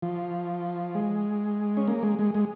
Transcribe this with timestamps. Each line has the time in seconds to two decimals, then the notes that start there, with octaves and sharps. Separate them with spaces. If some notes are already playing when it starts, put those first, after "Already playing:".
0.02 F3
0.95 G#3
1.77 C#4
1.88 A#3
2.03 G#3
2.19 G#3
2.34 G#3